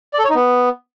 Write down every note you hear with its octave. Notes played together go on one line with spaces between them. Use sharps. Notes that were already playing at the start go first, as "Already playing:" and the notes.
D5
A4
C#5
D#4
B3